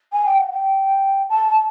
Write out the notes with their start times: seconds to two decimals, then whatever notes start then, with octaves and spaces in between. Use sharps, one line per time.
0.12 G#5
0.25 G5
0.38 F#5
0.51 G5
1.29 A5
1.48 A5